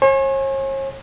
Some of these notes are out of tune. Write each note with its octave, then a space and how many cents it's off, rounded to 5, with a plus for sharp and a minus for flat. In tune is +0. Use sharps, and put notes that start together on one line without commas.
C#5 -40 G#5 +5